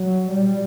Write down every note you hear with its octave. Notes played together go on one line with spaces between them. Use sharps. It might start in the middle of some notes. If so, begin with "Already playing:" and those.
Already playing: F#3
A#2 G3